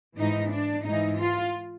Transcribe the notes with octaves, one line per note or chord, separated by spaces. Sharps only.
G#2 E3 D#4
D4
G#2 E3 D#4
F4